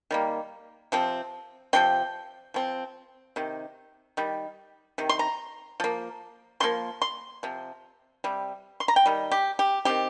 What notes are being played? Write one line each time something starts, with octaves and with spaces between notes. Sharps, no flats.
D#3 G3 A#3
C3 F3 C4
C3 F3 C4 G5
F3 C4
C3 D#3
D#3 G3
C3 D#3
C6
A#5
F3 A#3
C3 F3 A#3 C6
C6
C3 F3
C3 G3
C6
A#5
G5
D#3 G3
G4
G4
D#3 C4 G4